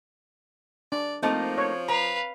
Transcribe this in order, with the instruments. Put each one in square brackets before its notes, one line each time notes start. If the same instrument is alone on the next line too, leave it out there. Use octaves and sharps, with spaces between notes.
[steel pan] D4 [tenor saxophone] D5
[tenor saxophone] F3 [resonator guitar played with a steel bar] A3 A#3 D#4 [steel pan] C4
[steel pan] C#5
[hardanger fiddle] B4 F5 [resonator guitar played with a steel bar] A#5